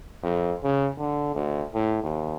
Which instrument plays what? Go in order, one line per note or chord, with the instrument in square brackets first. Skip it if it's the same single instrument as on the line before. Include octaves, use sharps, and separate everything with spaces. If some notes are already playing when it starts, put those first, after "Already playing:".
[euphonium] F2
C#3
D3
D2
A2
D#2